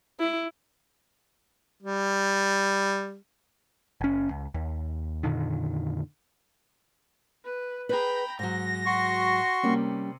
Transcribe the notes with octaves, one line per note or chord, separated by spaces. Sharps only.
E4
G3
F#1 C#4
C#2
D#2
F2 A#2 D3 D#3
B4
G#4 B4 G5 A#5 B5
G#2 F#3 A#6
F#4 C6 C#6
C3 G3 A#3 C#4